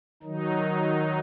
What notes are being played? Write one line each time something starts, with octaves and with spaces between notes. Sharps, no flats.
D#3 F#3 D#4